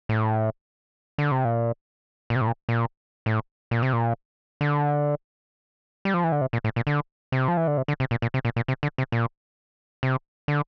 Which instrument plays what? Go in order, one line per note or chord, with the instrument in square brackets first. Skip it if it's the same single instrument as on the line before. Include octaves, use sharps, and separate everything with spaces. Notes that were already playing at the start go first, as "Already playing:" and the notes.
[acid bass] A2
D3
C3
A#2
A#2
C3
A2
A#2
A#2
A2
A#2
C3
A#2
D3
G3
F3
E3
D3
C3
A#2
A2
A#2
D3
C3
F3
E3
D3
C3
D3
C3
A#2
A#2
C3
A#2
A#2
C3
D3
C3
A#2
C3
D3